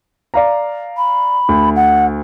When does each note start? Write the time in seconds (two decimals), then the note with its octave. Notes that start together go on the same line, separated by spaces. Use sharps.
0.34 D5 F5 A#5
0.97 B5
1.49 D2
1.76 F#5